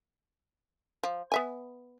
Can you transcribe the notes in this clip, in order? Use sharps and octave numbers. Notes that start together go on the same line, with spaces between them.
F3
B3 E5 G#5